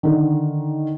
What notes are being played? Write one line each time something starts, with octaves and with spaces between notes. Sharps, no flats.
D3 D#3